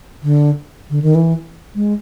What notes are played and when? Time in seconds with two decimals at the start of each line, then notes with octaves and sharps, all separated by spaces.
0.23 D3
0.90 D3
1.02 D#3
1.15 E3
1.75 G#3